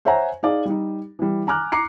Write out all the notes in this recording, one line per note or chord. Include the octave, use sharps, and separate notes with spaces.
C5 C#5 E5 F#5 G#5 A#5
D#4 G#4 D5 F5
G3 D#4
E3 G3
G#5 A#5 D6 F6 F#6
A#5 D6 C7 C#7